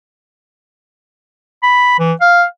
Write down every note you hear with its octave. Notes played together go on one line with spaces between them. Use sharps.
B5
E3
F5